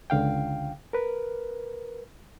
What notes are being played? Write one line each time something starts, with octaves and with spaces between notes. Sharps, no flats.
C#2 D3 F5 G5
A#4 B4